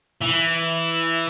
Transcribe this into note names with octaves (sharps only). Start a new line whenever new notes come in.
E3